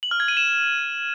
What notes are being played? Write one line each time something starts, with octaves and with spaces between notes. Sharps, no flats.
F#7
F6
G#6
D#7
E7